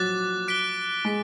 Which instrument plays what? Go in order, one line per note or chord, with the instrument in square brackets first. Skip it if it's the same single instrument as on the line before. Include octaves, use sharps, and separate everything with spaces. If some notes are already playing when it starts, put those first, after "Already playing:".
Already playing: [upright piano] F3 F#3 [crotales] D6 F#6 A6
[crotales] F#6 B6 D7 G7
[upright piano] G#3 [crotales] F#6 B6 D7